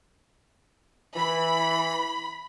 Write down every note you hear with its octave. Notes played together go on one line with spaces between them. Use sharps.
E3 B5